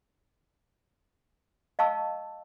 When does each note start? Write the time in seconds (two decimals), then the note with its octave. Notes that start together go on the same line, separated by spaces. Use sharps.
1.79 D#5 F5 A5 C#6 E6